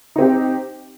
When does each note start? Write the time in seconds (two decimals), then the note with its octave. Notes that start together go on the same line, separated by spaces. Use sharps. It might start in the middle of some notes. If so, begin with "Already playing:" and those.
0.16 D#4
0.18 C4
0.21 G4